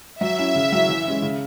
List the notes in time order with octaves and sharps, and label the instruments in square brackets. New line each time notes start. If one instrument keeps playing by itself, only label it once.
[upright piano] F#3 [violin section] E5
[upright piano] C#4 E4
C#3
F#3 C#4 E4
E3
G#3 C#4 E4
C#3